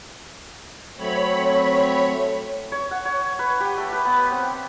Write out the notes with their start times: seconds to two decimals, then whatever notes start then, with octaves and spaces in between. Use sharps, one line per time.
0.97 F#3 A3 C4 C#5 B5
2.72 C#5
2.91 F#5
3.05 C#5
3.39 B4
3.60 G4
3.77 A3
3.92 B4
4.05 B3
4.32 C4